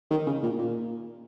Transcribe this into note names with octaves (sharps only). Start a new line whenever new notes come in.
D#3
C#3
A#2
A#2